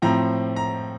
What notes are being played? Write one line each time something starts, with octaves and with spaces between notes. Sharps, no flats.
A2 F3 C4 A#5
A#5